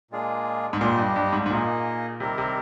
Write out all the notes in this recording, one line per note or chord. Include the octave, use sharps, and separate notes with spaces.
A#2 G#3 D4 F4 G#4
G#2
A#2 G3 D4 G4 C5 D#5
G2
G2
G#2
G#2
A#2 A#3 D#4 G#4 D#5
C3 D#3 G3 C4 G4 A#4
C3